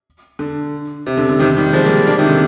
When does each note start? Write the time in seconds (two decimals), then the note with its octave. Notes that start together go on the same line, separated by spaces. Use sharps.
0.39 D3
1.06 C3
1.17 D3
1.29 D3
1.40 C3 D#3
1.57 D#3 G3
1.73 F3 G#3
1.85 G3 A#3
2.07 A#3 D4
2.18 C3 D#3
2.29 D3